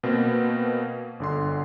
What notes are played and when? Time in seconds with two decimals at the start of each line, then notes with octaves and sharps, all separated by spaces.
0.03 B2 A#3 C4
1.20 G1 D3 C6